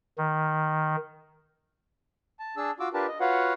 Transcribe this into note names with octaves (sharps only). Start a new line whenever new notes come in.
D#3
A5
D4 G#4 A5 E6
F4 F#4 D6 E6
D4 F4 G4 A#4 B4 A5
D#5
F4 F#4 B4 C#5 F5 F#5